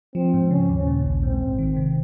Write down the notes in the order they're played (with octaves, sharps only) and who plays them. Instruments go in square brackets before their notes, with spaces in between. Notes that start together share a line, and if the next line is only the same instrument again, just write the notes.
[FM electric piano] F3 [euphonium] C4
[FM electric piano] G#2
[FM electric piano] C#3 [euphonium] C#4
[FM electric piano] D#2
A#2
A#1
[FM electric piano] G#2 [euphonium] C4
[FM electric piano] G#1
D#3
C3